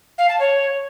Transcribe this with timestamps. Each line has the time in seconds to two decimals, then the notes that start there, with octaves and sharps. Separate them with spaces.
0.18 F5
0.29 A5
0.40 C#5